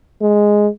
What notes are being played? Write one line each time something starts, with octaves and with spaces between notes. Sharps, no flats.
G#3